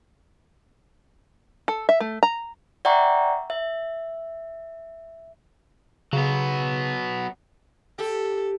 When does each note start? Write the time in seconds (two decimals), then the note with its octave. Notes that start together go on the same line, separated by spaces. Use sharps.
1.68 A4
1.89 E5
2.00 A3
2.23 A#5
2.85 D5 E5 F#5 G5 A#5 C#6
3.50 E5
6.13 C#3 F#3 B3
7.98 G4 A4